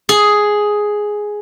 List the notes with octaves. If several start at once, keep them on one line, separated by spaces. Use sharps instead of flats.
G#4